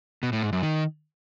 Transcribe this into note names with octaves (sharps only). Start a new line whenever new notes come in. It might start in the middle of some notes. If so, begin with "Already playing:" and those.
B2
A2
G#2
F#2
D#3